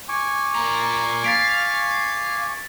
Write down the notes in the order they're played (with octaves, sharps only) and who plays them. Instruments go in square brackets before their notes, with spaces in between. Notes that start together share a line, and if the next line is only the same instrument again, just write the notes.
[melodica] G#5 C#6 D6
[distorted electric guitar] A#2 A#5
[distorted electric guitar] F5 [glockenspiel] A6 B6 D7